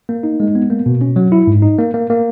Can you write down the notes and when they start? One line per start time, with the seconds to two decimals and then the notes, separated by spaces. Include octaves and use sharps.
0.09 A#3
0.23 D#4
0.40 G#3
0.55 B3
0.70 A#3
0.86 B2
1.01 C#4
1.16 F#3
1.32 E4
1.47 G#2
1.62 D#4
1.78 A#3
1.94 A#3
2.10 A#3